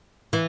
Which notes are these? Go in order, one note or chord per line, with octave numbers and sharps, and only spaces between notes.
E3